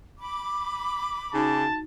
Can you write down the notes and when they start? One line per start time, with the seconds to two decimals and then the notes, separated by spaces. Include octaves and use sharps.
0.18 B5 D6
1.34 C#3 D#4 F#4 A5